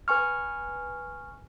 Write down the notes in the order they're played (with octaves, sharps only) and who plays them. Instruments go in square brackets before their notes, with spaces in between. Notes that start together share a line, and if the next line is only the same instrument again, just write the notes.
[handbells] B4 G#5 C#6 F6